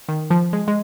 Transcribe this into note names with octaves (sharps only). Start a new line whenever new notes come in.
D#3
F3
G#3
G#3